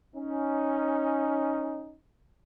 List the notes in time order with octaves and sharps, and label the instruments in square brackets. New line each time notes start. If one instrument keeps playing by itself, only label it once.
[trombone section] C#4 D#4